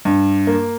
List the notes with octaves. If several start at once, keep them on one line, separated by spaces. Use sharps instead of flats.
G2
A#3